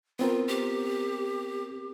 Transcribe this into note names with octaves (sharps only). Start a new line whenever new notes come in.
B3 C4 F4 A#4
G4